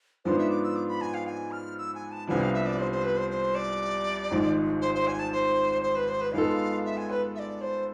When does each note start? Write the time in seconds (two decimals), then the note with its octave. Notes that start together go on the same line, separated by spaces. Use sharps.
0.25 G#2 F3 B3 D4 F4 C5
0.38 E5
0.50 D6
0.63 E6
0.76 D6
0.88 B5
1.01 G#5
1.14 F5
1.26 G#5
1.51 F6
1.78 E6
1.95 G#5
2.12 A5
2.28 C2 C3 F3 B3 D4 G#5
2.41 F5
2.54 E5
2.66 D5
2.79 C5
2.92 C5
3.04 B4
3.17 C5
3.30 C5
3.55 D5
4.31 G#1 G#2 F3 G#3
4.81 C5
4.94 C5
5.07 G#5
5.19 A5
5.32 C5
5.82 C5
5.96 B4
6.08 C5
6.21 B4
6.33 G#2 G#3 B3 F4 A4 F5
6.85 E5
6.97 G#5
7.10 B4
7.35 E5
7.39 D5
7.61 C5